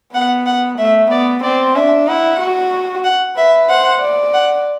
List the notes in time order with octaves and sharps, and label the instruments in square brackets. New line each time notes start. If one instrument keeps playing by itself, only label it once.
[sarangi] B3 [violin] F#5
[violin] F#5
[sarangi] A3 [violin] E5
[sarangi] B3 [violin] D5
[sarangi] C4 [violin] D5
[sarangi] D4 [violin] E5
[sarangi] E4 [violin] F#5
[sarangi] F#4
[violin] F#5
[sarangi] B4 [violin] E5
[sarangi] C5 [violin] F#5
[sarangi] D5
[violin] F#5